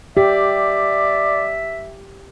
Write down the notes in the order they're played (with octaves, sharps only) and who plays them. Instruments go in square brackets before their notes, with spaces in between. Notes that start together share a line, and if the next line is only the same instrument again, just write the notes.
[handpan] G4 [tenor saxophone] D5 [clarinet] E5